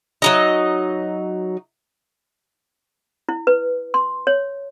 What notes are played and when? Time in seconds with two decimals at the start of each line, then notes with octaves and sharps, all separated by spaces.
0.22 F#3 D#4 D#5
3.29 E4
3.47 B4
3.94 C6
4.27 C#5